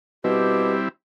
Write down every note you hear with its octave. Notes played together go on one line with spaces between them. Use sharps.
B2 G3 C4 E4 G4